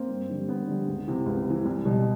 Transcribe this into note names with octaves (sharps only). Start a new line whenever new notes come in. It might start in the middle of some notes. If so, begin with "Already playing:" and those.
Already playing: A#3 C4
G2
D3 G3
G2 B3
D3 G3
C#2
C3 E3
C#2
C3 E3
C2
B2 G3